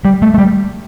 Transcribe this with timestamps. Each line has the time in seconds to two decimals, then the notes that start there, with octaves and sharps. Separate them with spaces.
0.05 G3
0.22 A3
0.34 A3
0.38 G3